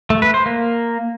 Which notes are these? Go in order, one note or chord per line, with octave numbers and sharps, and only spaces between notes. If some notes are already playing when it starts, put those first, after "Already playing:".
A3
B4
C5
A#3